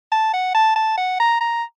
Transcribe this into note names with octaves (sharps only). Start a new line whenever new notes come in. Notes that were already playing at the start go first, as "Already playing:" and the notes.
A5
F#5
A5
A5
F#5
A#5
A#5